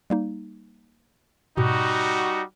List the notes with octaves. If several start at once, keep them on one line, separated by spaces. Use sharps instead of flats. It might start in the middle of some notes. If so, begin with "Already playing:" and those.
G3 A#3 D#4
G#2 B2 G3 D#4 F#4